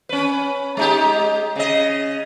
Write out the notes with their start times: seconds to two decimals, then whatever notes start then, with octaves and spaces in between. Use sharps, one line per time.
0.09 C#4 B4
0.77 G#3 D#4 G4
1.56 C#3 D#5